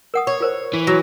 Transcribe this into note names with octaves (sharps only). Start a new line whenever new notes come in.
A#4 F#5 D#6
C#5
F4 A#4 C5
E3
F#3